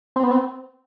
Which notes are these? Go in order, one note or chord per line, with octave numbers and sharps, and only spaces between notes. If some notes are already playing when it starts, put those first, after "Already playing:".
C4
B3
C4